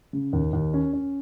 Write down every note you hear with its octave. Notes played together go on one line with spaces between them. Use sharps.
C#3
D#2
D#2
C#4
C#4